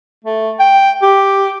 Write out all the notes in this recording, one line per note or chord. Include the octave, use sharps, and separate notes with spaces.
A3
G5
G4